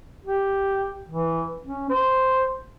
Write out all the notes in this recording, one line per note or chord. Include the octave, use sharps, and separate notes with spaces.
G4
E3
C#4
C5